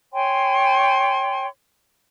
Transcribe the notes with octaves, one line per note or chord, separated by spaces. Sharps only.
C#5 G5 G#5 C6